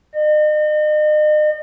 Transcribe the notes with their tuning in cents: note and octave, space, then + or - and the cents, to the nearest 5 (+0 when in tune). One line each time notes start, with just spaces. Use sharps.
D#5 -40